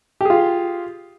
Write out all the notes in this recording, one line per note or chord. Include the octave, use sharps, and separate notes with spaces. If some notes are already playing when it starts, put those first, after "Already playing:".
F4 G4 G#4